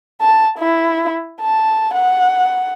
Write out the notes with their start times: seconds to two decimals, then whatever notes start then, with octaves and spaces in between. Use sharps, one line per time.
0.21 A5
0.59 E4
1.41 A5
1.94 F#5